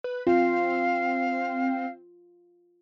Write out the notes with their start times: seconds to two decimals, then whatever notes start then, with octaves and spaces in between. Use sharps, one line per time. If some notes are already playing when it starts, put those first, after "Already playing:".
0.04 B4
0.27 C4 F4 F5